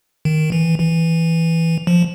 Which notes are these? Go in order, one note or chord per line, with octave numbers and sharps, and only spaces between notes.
D#3
E3
E3
F3